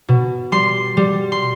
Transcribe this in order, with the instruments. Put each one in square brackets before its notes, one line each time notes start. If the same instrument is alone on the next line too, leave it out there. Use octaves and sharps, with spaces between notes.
[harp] B2
G3 C6
G3
C6